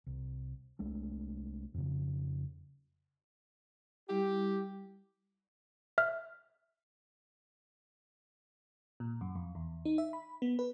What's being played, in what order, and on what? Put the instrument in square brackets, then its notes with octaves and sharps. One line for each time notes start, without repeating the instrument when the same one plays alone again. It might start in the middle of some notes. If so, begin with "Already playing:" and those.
[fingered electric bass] C2
C2 G#3 A3 D4
F2 C#3
[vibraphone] G3 E4 [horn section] G4
[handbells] E5 F6
[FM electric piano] A#2
F#2
F2
E2
D#4
E5
B5
B3
B4